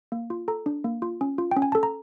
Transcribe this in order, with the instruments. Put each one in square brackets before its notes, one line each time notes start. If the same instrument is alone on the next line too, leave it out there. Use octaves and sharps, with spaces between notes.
[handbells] A#3
F4
A4 A#5
D4
A#3
F4
C#4
F4
G5
C#4
G#5
A4 A5
A#5